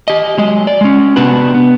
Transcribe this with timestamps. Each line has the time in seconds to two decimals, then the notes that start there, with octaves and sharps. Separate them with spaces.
0.08 G4 D#5
0.37 F#3 G#3 D#5
0.67 D5
0.81 G#3 C#4
1.16 C3 B3 D4 F#4 G4 B4
1.54 B3